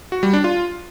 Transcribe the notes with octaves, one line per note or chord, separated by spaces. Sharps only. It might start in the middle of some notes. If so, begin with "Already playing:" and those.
F#4
G3
D4
F4